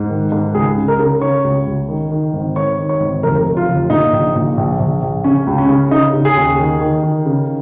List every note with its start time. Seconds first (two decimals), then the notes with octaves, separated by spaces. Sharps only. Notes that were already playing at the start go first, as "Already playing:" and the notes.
Already playing: G#2
0.10 D#3
0.32 G#2
0.54 C#2 G#4
0.77 C#3
0.88 A#4
0.99 C#3
1.21 C#3 C#5
1.44 C#2
1.66 C#2
1.88 D#3
2.11 D#3
2.34 G#1
2.56 D#3 C#5
2.78 D#3
2.89 C#5
3.01 G#1
3.23 F1 A#4
3.46 F1
3.57 F4
3.68 F1
3.90 A#2 D#4
4.13 A#1
4.35 A#2
4.57 A#1
4.79 A#1
5.02 A#1
5.24 C#3 C#4
5.47 C#2
5.58 C#4
5.69 C#3
5.91 C#3 D#4
6.14 C#3
6.25 G#4
6.36 D#2
6.59 D#3
6.81 D#3
7.03 D#3
7.26 C#3